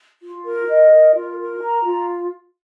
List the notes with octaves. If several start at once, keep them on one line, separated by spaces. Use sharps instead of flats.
F4
A#4
D#5
A#4
F4
A#4
A#5
F4